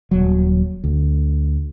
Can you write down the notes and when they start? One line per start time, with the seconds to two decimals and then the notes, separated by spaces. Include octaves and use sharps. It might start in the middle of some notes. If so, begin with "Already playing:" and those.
0.11 D#1 F#3
0.84 D2